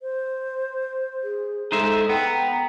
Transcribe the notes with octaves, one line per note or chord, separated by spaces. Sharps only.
C5
G#4
G#3 D#4 A4 C5 E5
B3 G5 A#5